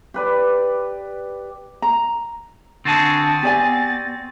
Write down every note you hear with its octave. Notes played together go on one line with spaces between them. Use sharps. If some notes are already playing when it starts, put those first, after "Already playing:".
G4 B4 D5
A#5
D3 C4 F#4 G#4 A5 A6
B3 G4 D5 G#5